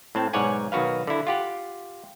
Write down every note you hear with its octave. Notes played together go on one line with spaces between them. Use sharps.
A2 C4 A5
B1 G#2 C#5 D5 F#5 G#5
B1 D#3 F#4 B4 F5
D3 E4
F4 G4 F#5